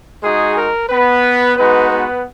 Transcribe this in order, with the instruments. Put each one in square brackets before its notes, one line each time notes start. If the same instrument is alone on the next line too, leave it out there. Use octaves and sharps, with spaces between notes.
[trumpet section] G#3 D#4 F#4 G#4
A#4
B3 B4
G#3 B3 D#4 F#4 B4
B3 B4